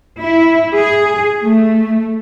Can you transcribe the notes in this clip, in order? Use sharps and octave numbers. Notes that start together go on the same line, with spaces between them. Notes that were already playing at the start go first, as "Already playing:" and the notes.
E4
G#4
A3